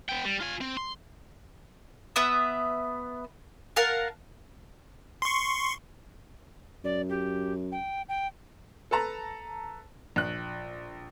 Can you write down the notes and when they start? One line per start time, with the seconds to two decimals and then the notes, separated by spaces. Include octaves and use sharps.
0.09 B3 G5
0.25 G3
0.41 F4 G#5
0.61 C4
0.77 C6
2.16 B3 B4 E5 D#6
3.76 A#4 F5 F#5 A5
5.22 C6 C#6
6.84 F#2 D5
7.09 G4
7.72 G5
8.09 G5
8.91 A4 B4 A5 A#5
10.16 A#1 F#6